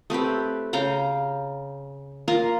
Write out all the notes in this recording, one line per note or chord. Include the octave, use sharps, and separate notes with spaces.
A3 C4 G4 B4
C#3 F5 G5 A#5
A#3 F4 A#5 C6